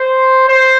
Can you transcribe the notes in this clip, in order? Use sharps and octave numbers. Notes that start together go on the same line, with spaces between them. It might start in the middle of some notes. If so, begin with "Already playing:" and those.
Already playing: C5
C5